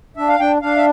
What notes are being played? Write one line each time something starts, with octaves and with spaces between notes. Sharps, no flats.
D4 E5
F5
D4 G5
D4 F5
E5